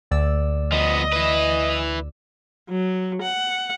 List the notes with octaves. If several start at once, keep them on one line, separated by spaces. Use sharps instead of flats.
D2 D5 E6
F3 B3 D#5
E4 B4
F#3
F#5